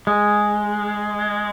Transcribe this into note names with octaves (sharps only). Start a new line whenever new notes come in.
G#3